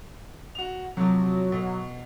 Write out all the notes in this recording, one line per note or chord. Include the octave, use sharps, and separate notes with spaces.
F#4 F7
C3 F3 F#3
B2